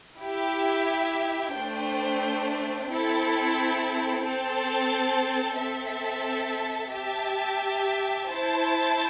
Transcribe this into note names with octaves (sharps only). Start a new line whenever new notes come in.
E4 G4 E5
A3 D4 C5 G5
C4 E4 A4
C4 A4 C5 A5
C4 A4 E5 A5
G4 E5 A5
E4 C5 A5